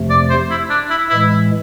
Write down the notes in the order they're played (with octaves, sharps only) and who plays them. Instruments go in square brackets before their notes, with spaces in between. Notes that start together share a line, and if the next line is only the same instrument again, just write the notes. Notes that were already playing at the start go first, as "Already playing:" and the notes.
Already playing: [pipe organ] F2 C3 F3 A3
[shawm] D5
C5
E4
D4
E4
[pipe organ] A2 E3 G#3 [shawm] E4